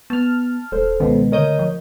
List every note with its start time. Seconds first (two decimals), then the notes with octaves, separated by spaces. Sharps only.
0.10 B3 A5 F6
0.72 D#1 A4 C5
1.00 C#2 B2 D#3
1.32 D2 A#4 C#5 D#5 D#6 G6
1.59 F3